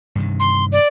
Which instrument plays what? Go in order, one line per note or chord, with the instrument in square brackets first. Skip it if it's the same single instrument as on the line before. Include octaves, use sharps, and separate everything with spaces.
[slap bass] G2 C3 D#3
[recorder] C6
D5